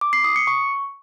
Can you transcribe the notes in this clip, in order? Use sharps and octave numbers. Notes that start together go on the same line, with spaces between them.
D6
C7
D#6
C#7
C#6